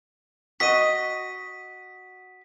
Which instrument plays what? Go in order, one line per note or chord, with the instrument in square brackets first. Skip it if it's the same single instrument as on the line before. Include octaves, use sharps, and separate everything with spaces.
[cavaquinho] F#4 D#5 [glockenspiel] B6 D#7